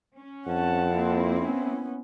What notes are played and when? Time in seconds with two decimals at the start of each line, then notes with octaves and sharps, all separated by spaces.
0.17 C#4
0.47 F2 F#5 A5
0.89 A#3 C4 E4
1.35 B3 C#4